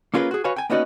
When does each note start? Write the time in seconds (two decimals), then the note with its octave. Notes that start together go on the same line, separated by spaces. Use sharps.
0.14 A#3 C#4 F4 G#4 A#4 B4
0.31 F#4 G#4
0.44 F#4 B4 C#5 F5 G#5
0.56 G5 G#5
0.70 A#3 B3 C#4 D#4 F#4 D5